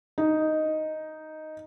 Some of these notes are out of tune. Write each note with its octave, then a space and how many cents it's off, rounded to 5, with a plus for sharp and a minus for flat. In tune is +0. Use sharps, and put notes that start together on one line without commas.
D#4 +0 D#5 +0